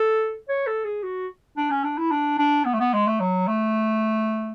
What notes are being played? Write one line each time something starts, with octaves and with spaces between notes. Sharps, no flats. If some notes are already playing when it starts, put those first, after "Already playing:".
Already playing: A4
C#5
A4
G#4
F#4
D4
C#4
D4
E4
D4
D4
B3
A3
B3
G#3
A3
F#3
A3